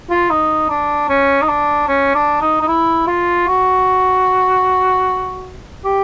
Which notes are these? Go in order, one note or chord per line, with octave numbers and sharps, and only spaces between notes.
F4
D#4
D4
C#4
D#4
D4
C#4
D4
D#4
D#4
E4
F4
F#4
G4